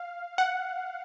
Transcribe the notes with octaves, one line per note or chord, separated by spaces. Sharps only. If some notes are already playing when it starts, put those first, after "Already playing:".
Already playing: F5
F#5